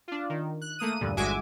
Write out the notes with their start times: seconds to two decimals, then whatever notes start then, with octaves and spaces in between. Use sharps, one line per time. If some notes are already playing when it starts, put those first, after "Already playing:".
0.08 D4 F4
0.30 D#3
0.61 F#6
0.79 A3 A#3 D#6 D#7
1.01 E2 G2 A#2 D3
1.17 G1 G#3 F#4 E5 G#5 D6